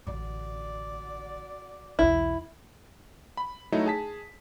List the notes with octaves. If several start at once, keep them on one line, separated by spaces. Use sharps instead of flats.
A1 D3 F#4 D5
B1 E2 E4
B5
F#3 A3 D#4 E4
G#4 A5 B6